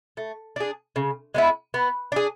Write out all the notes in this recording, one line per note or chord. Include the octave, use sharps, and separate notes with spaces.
A3
D4 G#4
C#3
G#3 B3 E4
B3
D4 G#4